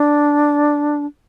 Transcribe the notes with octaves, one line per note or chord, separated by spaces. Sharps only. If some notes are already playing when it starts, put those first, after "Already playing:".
Already playing: D4